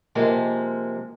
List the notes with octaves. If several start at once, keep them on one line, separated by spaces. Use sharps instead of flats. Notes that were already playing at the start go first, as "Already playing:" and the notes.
C3 F3 G#3 A#3